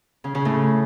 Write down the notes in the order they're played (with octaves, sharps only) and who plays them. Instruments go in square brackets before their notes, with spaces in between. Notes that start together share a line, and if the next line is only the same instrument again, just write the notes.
[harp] C#3
C#3
A2